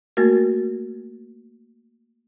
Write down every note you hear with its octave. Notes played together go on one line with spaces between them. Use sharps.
A3 A#3 F#4 A#4